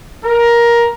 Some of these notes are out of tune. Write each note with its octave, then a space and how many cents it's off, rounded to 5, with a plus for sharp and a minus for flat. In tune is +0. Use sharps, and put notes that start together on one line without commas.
A#4 +15